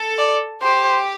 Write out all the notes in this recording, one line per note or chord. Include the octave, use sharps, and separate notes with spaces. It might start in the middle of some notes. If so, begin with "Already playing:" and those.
Already playing: A4
D5
G4 C5